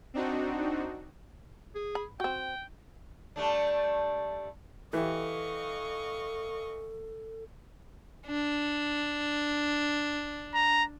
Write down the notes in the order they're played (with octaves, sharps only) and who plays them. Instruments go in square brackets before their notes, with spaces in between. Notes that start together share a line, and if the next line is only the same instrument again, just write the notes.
[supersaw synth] C4 D4 D#4 F#4
[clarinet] G#4
[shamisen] B5
[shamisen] C4 F#4 [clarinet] G5
[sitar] G3 A3 D4
[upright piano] E3 G4 [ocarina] A4 [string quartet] D#5 F5 C#6
[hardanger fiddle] D4
[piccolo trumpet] A#5